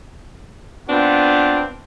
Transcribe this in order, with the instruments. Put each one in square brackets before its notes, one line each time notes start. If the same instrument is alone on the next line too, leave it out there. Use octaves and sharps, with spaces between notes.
[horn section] B3 C4 D4 F4